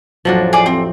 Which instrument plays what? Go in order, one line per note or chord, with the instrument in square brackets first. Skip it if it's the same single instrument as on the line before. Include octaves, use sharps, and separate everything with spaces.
[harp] A1 F2 [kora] F3 F#3 D4
[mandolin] G#4 D5
C4